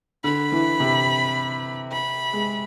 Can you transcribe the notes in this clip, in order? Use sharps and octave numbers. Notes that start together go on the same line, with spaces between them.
D3 B5
E3
C3
B5
G#3